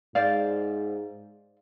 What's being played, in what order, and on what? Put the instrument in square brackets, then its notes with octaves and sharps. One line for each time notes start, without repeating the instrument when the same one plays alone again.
[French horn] G#2 [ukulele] C5 D5 F5